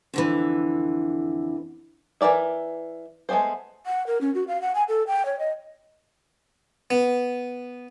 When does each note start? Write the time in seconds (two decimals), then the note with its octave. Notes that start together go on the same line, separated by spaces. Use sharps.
0.14 F2 D3 E3
2.21 E3 F#3 A#4 D5 E5
3.29 G#3 A3 B3 C4 C5
3.86 F#5
4.07 A#4
4.21 C#4
4.35 F#4
4.48 F5
4.62 F#5
4.75 G#5
4.88 A4
5.07 G5
5.26 C#5
5.39 D#5
6.90 B3